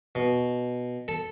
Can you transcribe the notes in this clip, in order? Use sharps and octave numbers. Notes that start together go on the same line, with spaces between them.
B2
A4